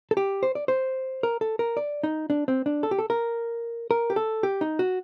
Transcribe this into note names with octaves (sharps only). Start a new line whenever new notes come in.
A4
G4
C5
D5
C5
A#4
A4
A#4
D5
D#4
D4
C4
D4
A4
G4
A4
A#4
A#4
G4
A4
G4
D#4
F#4